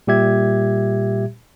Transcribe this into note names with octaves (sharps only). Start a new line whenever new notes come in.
A#2 G3 G4 E5 G#6